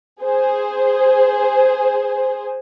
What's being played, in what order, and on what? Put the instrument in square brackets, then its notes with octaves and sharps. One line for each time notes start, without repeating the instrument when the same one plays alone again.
[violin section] G#4 C5